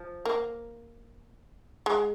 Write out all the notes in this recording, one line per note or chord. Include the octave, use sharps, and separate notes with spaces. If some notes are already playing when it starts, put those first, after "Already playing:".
Already playing: F3
A#3
G#3